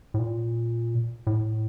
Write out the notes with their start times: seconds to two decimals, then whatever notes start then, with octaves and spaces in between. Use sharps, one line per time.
0.14 A2
0.19 A#2
1.27 A2